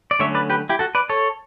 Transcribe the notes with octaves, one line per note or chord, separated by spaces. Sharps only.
D5
D3 F#3 A3 C#4 C#5 E5
B4 D5
G4 B4
E4 G4
F#4 A4
B4 D5
A4 C#5